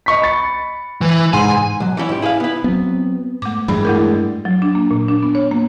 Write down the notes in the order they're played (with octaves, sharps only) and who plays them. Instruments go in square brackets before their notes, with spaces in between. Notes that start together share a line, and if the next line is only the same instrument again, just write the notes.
[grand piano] D#5 C#6 B6
B5 A6 C#7
[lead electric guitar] E3
[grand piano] G#2 C6 D#7 [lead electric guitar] G#5
[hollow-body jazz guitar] B1 F#3
E3 G3 C#4 E4
G#2 G4
E4 G#4 D#5 F5
B3 E4
[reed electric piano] F#3 C4 [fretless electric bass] B3
[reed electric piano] G#2 [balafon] A3 D6
[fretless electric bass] G2 [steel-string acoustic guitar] E3 G3 G#3 [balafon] B5
[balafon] A3 E4 A#4
[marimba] F#3
D4
A#3
A#2
D4
B3
C#5
A#3